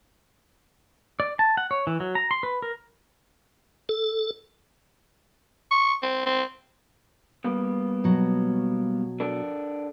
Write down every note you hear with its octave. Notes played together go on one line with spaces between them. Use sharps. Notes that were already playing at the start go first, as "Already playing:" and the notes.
D5
A5
F#5
C#5
E3
F#3
A#5
C6
B4
A#4
A4
C#6
C4
C4
G3 A#3 B3
B2 F#3
D4 A4 A#4